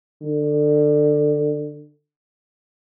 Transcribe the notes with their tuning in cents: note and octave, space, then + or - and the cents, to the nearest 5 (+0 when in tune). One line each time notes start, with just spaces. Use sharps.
D3 +20